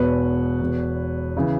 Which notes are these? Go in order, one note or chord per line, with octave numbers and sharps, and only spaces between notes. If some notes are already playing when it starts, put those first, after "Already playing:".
Already playing: E1 E2 B2 B4 C#5
E1 E2 B2
C#3 E3